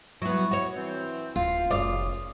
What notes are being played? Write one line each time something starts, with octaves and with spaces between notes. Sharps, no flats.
F#3 B3 E4 C#6
F#4 C#5
E3 C4
D1 F4
F1 A#1 F#2 C#3 D5 F5 D#6